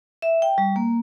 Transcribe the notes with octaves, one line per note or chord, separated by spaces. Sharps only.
E5
G5
G3
A#3